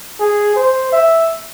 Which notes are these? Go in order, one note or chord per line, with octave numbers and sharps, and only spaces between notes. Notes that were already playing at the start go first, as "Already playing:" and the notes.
G#4
C5
E5